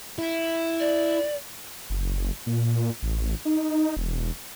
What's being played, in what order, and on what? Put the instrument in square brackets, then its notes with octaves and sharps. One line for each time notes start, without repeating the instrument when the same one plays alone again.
[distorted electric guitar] E4
[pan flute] D5
[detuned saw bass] F#1
A#2
A1
D#4
E1